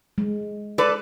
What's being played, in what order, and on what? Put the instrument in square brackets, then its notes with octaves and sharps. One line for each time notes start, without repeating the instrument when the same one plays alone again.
[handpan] G#3
[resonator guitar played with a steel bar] A4 B4 D5